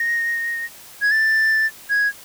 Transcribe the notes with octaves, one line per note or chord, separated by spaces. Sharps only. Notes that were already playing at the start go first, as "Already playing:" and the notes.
Already playing: A#6
G#6
A6
G#6